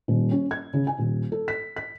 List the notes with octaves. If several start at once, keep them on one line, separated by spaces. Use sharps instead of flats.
D#1
C#4
G#6
C#3
G#5
D#1
A4
B6
B6